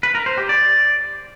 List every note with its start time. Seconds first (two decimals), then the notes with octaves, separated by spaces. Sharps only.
0.03 B4
0.15 A#4
0.26 C5
0.38 G4
0.49 D5